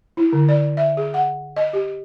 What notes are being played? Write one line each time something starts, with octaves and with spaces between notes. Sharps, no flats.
E4
D3
D5
E5
G#4
F#5
D#5
G4